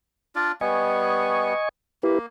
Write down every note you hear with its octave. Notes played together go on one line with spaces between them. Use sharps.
D4 F4 D5
G3 B3 D#5 G#5 C#6
A#3 E4 G4 B4